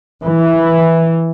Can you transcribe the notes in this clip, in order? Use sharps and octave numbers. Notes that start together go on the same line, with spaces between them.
E3